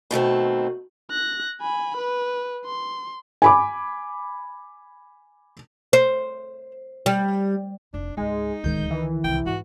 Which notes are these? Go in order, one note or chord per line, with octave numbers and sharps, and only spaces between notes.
B2 D#3 A3 C4
F#6 A#6
G#5 B5
B4
C6
G#5 B5 D6
C5
G3
F1 D4 D#4
C#2 G#2 G#3 D#4
D1 C#2 D3 D#3 G#3 G6
D#3 E3
C2 F4 G5
G#2 F#4